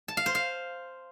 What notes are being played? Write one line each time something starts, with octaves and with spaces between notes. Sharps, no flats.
A5
F5
C5
F5